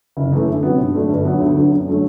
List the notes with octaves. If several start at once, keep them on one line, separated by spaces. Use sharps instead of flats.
F#1
F#2 E3 A3
D2
C3 F#3 B3
G2
D3 F#3 A3 D4
G1
G2 F#3 B3
D2
D3 F#3 B3 F#4
F#2
D3 F#3 A3